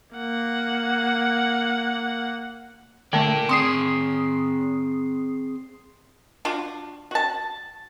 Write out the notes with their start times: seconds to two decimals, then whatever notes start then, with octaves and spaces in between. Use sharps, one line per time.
0.15 A#3 F#5
3.13 D3 A3 A#4 D5 G5 A5
3.49 C4 G#4 C6 D6 D#6 C7
6.45 D4 F4 F#4
7.11 F#4 A5